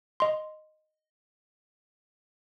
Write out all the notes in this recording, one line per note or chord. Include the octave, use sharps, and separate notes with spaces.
D#5 C6